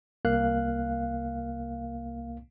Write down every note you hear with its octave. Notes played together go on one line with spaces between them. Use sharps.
C2 A#3 F5 F#6